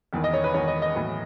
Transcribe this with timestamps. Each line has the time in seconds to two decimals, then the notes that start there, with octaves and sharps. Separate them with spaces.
0.13 E1 E2 D#3
0.24 D#5
0.33 C#5
0.44 B4
0.54 E1 E2 D#3 C#5
0.68 D#5
0.82 D#5
0.96 B1 A2 E3